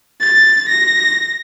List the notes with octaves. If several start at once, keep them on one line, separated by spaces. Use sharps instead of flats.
A6
A#6